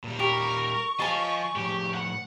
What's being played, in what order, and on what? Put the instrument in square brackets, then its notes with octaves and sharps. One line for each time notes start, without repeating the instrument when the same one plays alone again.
[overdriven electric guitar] A#2 G3
[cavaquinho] G4 [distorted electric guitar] A#4 [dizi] C#6
[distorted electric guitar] F3 F4 [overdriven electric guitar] D#5 F5 [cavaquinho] G#5 A5
[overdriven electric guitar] A2 F3 [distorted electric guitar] G4
[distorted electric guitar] F#5